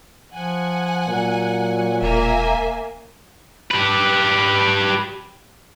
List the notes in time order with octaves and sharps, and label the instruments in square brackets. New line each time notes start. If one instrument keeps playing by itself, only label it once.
[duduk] F3 [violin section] F#5 G#5
[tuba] A#2 [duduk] F#3
[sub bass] E1 [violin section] A#3 E5 G#5
[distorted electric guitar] G4 B4